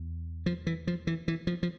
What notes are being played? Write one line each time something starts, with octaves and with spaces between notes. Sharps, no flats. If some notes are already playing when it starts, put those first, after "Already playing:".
Already playing: E2
F3
E3
F3
E3
E3
F3
F3